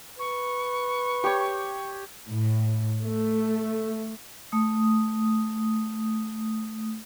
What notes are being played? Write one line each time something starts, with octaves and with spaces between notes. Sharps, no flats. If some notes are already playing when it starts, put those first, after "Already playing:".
B4 C#6
G4 C#5
A2
A3
A3 D#6